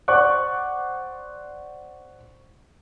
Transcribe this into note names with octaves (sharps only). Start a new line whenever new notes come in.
C5 D5 F#5 C#6 D6 F#6